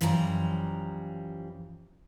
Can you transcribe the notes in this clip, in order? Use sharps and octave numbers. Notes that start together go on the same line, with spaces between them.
F#2 E3 F3 G3 A5 A#5